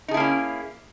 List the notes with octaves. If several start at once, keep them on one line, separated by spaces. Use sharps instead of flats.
A#3 C#4 D#4 E4 G#4